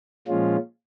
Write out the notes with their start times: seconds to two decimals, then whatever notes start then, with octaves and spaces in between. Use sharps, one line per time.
0.27 A#2 F3 G#3 C#4 F4